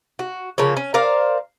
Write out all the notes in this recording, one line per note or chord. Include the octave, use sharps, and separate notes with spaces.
F#4
C#3 F3 A#3 C#5
C#4
A#4 C5 D5 F5